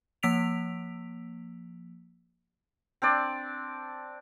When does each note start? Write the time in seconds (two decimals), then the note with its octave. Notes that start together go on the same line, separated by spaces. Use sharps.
0.23 F3 A#3 E6 B6 D7 F7
3.02 C4 D4 D5